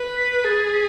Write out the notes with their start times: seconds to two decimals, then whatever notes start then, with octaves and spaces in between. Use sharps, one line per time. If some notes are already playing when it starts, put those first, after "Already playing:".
Already playing: B4
0.17 B6
0.44 G#4 A6
0.73 B6